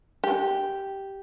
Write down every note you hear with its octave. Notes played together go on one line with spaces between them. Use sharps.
G4